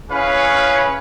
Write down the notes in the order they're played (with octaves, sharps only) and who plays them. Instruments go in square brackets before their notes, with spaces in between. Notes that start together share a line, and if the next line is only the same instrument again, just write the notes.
[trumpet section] C#4 E4 G#4 B4 C#5 F5